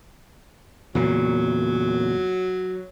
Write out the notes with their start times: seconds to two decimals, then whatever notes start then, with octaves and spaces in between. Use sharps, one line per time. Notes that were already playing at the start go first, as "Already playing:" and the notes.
0.95 E2 A#2 C#3 F#3